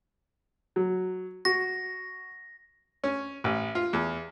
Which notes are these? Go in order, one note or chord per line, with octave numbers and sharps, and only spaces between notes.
F#3
F#4 A#6
C#4
A1
F4
E2